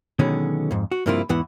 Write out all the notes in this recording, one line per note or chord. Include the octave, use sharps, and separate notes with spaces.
B2 D3 D#3 F#3 G#3 C#4
F2 G#2
F#4
G2 C3 F3 A#3 E4 F4
E2 G#2 E3 B3 F#5